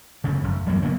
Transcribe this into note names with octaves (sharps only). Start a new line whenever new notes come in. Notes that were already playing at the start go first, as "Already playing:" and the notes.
F1 D2 C#3
F1
E2 G2 F#3 A#3
F#1 C#3 A#3 B3